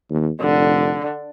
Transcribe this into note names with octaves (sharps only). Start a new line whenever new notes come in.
D#2
F1 D3